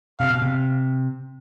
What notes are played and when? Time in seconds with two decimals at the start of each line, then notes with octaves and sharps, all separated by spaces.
0.19 C3 F5
0.30 B2
0.42 C3